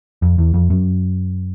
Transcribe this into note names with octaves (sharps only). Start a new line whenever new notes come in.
F2
E2
F2
F#2